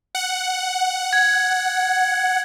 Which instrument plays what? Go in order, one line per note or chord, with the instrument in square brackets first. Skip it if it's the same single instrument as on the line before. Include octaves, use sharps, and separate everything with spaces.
[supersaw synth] F#5
[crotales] G#6